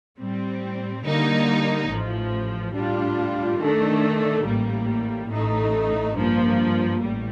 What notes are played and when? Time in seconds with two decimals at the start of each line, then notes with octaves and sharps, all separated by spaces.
0.19 A2 G3 C4
1.04 D3 G3 A#3 D#4
1.89 A1 A2 F3
2.75 A2 G3 D4 F4
3.60 D#3 A3 D4 A4
4.45 A1 A2 G3 A#3
5.30 A1 A2 A3 D#4
6.16 G2 F3 A#3
7.01 A1 A2 G3